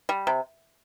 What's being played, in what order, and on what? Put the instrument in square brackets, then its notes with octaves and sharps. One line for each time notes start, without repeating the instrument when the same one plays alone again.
[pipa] G3
C3